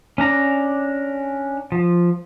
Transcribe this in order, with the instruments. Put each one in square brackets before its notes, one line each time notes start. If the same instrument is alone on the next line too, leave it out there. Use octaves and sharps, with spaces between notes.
[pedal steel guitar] C#4 D4 A#5
F3